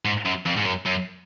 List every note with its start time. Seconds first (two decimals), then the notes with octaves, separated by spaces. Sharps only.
0.05 G#2
0.25 F#2
0.45 F2
0.56 G#2
0.65 F#2
0.85 F#2